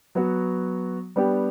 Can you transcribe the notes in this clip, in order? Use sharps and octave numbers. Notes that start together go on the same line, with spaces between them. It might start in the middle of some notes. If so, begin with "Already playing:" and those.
F#3 B3 F#4
G3 B3 D4 G4